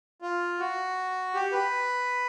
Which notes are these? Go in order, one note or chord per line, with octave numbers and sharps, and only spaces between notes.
F4
F#4
G4
B4